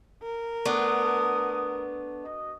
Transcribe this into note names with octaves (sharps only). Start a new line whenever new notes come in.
A#4
A3 B3 D4 F#5 D#6
F#4 D#5